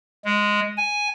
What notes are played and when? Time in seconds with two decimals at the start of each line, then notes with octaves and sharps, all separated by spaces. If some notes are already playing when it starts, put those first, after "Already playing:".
0.25 G#3
0.77 G#5